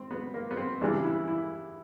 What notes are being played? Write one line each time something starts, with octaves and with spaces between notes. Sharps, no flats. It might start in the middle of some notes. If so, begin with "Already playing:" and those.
Already playing: C4
B3
A#3
B3
C4
E2 C#3 E3 G3 D4
E4
E4